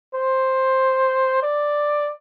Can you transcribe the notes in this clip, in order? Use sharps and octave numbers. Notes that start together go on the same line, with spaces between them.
C5
D5